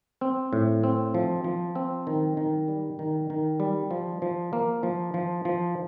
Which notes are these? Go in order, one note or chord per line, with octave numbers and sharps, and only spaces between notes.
C4
A2
C4
F3
F3
C4
D#3
D#3
G3
D#3
D#3
G3
F3
F3
A#3
F3
F3
F3